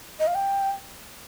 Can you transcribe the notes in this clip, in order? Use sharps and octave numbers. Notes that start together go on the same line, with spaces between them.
D#5
F5
G5